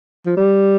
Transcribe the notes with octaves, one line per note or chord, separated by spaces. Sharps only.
F3
G3